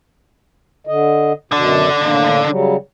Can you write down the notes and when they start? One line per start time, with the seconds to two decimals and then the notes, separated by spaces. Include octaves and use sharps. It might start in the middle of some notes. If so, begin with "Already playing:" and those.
0.87 D3 D#5
1.52 F#2 B2 D3 D4
2.01 A2 A#3
2.47 C#3 F#3 G3